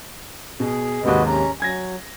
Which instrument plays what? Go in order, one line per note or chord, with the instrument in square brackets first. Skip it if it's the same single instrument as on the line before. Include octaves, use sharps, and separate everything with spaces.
[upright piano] B2 [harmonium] G#4
[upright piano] D#2 G#2 C3 [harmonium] F#4 B4 D#5
[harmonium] C#4 A#5
[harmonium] F#3 [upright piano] G#5 G#6 A#6